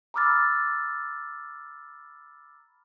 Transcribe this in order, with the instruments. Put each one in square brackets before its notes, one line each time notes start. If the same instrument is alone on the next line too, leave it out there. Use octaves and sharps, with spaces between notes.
[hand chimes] A#5 B5 D6 E6 F6 A6